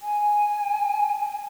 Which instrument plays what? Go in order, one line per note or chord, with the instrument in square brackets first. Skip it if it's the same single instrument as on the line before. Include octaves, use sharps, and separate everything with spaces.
[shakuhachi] G#5